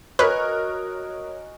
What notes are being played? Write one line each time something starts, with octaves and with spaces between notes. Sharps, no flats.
F#4 A#4 B4 C#5 D#5 G#5 F6 F#6